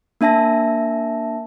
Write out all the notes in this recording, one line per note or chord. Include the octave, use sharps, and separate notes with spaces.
A#3 D4 E5 A5 A#6